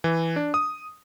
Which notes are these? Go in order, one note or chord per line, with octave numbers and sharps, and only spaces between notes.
E3
D4
D#6